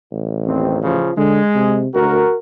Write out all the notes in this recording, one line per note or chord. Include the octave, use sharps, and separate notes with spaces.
A1
D#2 C4
C#3 F3
D3 G#3
C3
D2 F#4 A#4